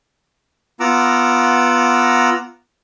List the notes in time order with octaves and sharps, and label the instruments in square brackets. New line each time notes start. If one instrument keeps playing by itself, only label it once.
[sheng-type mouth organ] B3 F4 F#5 A#5 D6 E6